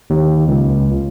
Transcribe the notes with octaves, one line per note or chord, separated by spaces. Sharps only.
D#2
C#2